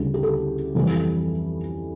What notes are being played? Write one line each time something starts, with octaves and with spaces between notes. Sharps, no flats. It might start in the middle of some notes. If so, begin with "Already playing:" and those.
Already playing: D2 C#3 G3 E4
G4
A4
F2 E3 G3